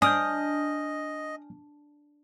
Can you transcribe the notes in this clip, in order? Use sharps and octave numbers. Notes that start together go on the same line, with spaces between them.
D4 D#5 G#5 D#6 F6 G6